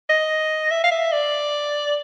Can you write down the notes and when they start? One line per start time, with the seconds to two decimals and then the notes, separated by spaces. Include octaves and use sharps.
0.09 D#5
0.71 E5
0.84 F5
0.91 E5
1.12 D5